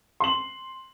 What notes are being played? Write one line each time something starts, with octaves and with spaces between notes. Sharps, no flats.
C6 F#7